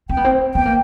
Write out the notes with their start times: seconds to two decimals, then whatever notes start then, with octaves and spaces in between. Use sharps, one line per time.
0.09 C4 G5
0.17 B3
0.25 C4
0.54 B3 G5
0.65 A#3